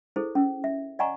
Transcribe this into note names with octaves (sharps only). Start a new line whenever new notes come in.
E4 G#4 A4 C5
C#4
E5
D5 D#5 F#5 G#5 A#5 C#6